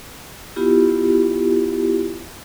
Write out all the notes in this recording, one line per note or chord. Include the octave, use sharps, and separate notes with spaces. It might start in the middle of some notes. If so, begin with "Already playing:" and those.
B3 E4 F4 G4